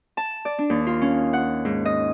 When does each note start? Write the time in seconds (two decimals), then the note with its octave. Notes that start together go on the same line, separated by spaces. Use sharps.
0.17 A5
0.45 D5
0.59 D4
0.70 D#2
0.87 F4
1.01 C#4
1.33 F#5
1.65 G#2
1.85 D#5